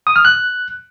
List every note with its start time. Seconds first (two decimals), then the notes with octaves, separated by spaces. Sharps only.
0.07 D#6
0.16 F6
0.25 F#6